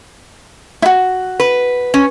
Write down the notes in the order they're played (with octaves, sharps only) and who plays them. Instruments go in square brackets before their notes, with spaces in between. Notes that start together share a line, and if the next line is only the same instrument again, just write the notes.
[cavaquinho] E4 F#4
[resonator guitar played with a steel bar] B4
C#4